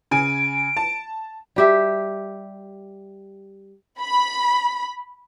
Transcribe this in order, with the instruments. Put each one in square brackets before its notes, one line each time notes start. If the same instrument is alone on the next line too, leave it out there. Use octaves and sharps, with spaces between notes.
[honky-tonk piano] C#3 G#5 [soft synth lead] D7
[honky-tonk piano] A5
[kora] G3 G4 E5
[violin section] B5